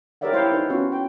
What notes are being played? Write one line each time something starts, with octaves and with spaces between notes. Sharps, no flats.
G4 A#4 C#5 D5 E5 F#5
E4 C5 C#5 F5 G5
D#4 B4
B3 C#4 F4 F#4
G5